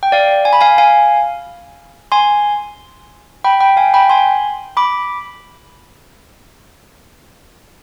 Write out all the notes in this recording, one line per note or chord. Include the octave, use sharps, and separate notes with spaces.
G5
D5 F5
G#5
B5
F5 G#5
F5 G#5
G#5 C6
G5 B5
G5 B5
F5 G#5
G5 B5
G#5 C6
B5 D6